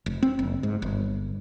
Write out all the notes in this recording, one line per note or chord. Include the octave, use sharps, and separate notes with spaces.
F1
C4
F#1
G#2
G1